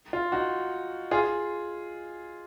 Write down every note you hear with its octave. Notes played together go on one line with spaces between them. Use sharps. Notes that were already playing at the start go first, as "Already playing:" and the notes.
F4
D#4 F#4
F4 G#4